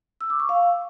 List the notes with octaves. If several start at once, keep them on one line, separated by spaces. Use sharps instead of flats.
E6
D6
C#6
F5